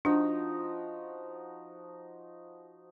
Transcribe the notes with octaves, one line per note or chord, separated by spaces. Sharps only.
F3 D4 D#4 F#4